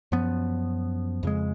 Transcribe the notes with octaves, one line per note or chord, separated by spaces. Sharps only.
F#2 F3 B3
F2 C#3 G#3